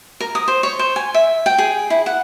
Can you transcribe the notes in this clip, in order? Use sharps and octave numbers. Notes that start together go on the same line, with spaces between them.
A#4
D#6
C5
C#5
C5
G#5
E5
G5
G#4
E4
F#5